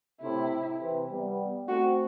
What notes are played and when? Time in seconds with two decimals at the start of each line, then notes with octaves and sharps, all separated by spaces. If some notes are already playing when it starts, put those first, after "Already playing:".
0.21 A2 C3 E4
0.80 C3 E3
1.10 G3 B3
1.68 A3 C4 F#4